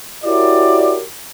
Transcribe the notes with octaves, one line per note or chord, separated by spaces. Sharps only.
E4 F#4 G4 A#4 C#5 D5